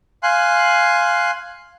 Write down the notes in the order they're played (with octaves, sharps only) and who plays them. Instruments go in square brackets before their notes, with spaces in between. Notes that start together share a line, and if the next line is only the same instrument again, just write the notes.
[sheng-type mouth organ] F5 G#5 C6 F#6